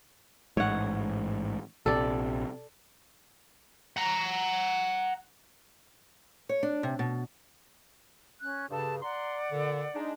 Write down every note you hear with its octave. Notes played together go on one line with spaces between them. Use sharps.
A1 G#2 C#5 F#5
A#1 C3 A4 D5
F#5 A#5
C#5
D4
C3
B2
C#4 F#6
G2 C#3 A4 A5
D5 F#5 A#5 C6
A#2 D3
G#3 D4 D#4